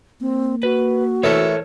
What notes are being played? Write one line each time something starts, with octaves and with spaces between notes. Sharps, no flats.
A#3 C4
F#4 B4
E3 A3 A4 A#4 C#5